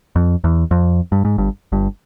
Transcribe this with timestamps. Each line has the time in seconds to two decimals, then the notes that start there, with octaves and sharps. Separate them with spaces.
0.16 F2
0.44 E2
0.71 F2
1.12 G2
1.25 G#2
1.38 G1 G2
1.72 G1 G2